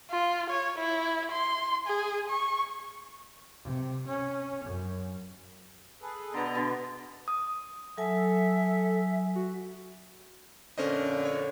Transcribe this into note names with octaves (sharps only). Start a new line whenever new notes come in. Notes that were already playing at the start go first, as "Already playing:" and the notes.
F4
C#5
E4
C6
G#4
C#6
C3
C#4
F#2
G#4 A4 B4
B2 D3 B3 D#5 A#5
B2 D3
D#6
F#3 A4 E5 G#5
F#4
F2 A#2 D3 C#4 C5 D#5
C#5